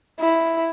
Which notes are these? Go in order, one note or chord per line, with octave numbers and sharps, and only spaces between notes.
E4